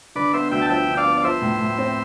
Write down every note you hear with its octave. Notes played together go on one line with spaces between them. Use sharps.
D3 B4 D5
B3 C5 E5
D2 E5 G5
A5
F3 E5 G5
D3
D5 F5
B3
D5
F3 C5 E5
A2
A2
C4